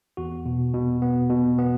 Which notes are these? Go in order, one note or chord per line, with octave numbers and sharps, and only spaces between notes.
E2 F#4
B2
B2
B3
B2
B3